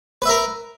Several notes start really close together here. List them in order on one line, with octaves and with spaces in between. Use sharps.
B4 E5 A#4